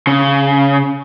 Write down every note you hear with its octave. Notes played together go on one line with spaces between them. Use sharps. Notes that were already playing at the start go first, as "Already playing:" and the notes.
C#3